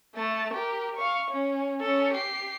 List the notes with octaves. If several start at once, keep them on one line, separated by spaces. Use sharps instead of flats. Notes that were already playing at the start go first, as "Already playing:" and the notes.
A3 A5
G4 A#4
F5 C#6
C#4
C#4 A4
G4 C7